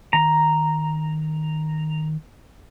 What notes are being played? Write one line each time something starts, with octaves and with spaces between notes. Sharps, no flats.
D#3 A#5